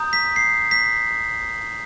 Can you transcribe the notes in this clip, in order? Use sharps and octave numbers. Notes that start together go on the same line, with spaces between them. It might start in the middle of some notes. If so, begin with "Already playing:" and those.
Already playing: A#5 D#6 G6
B6
C7
B6